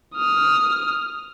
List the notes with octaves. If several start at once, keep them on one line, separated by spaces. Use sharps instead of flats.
D#6 F6